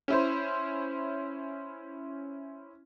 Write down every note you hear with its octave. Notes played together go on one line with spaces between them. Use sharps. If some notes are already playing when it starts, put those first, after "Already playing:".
C#4 E4 C5